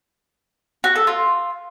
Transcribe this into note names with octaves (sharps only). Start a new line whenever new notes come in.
F#4
A4
F4